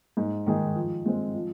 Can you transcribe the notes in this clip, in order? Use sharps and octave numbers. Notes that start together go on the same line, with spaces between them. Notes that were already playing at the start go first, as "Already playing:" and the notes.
G#2
D#3 G#3 D#4 G#4
F3
G#3 C4
F3